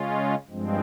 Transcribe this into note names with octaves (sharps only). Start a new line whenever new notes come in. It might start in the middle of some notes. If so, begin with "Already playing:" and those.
Already playing: C#3 G#3 C#4 F4
G2 F3 G#3 C4